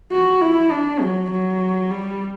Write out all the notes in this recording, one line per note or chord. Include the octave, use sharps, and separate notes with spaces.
F#4
E4
D4
F#3
F#3
G3